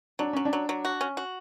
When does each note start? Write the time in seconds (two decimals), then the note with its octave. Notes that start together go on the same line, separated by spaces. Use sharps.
0.19 F#3 D4
0.33 F#3 C#4
0.45 D4
0.53 F#3
0.69 F#3
0.85 F#4
1.01 C#4
1.17 F#4